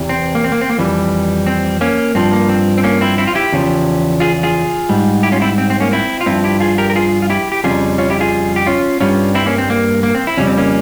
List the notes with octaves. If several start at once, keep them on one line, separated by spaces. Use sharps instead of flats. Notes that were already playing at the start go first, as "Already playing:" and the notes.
Already playing: E2 C3 E3
C4
A#3
C4
A#3
C4
A#3
F2 E3 G3
C4
A#3 C#4
G2 F3 C4
A#3
C4
C4
A#3 C#4
C4 E4
C4 E4
F4
E4 G4
E2 C#3 F3
F4 G#4
F4 G#4
G#2 G3
E4 G4
C#4 F4
C4 E4
C4
C4
A#3 C#4
C4 E4
F4
G2 F3 C4 E4
E4 G4
F4 G#4
G4 A#4
A#4
F4 G#4
F4
E4 G4
G4
F2 C#3 G3 F4 G#4
C#4 F4
E4 G4
F4 G#4
G4
C#4 F4
G2 G3 C#4 F4
C4 E4
A#3 C#4
C4
A#3
A#3
C4
E4
F2 C#3 G3 C#4
C4
A#3 C#4